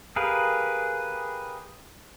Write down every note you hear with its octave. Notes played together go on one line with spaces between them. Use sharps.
G4 G#4 A#4 B4 F5